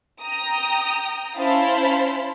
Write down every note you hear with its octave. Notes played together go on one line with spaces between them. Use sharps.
G5 A#5 D#6
C#4 E4 C5 F5 A5 B5